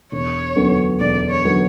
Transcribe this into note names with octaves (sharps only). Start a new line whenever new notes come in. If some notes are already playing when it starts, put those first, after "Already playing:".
E1 C#5
D2 D3 F#3 B3
E1 D5
C#5
D3 F#3 B3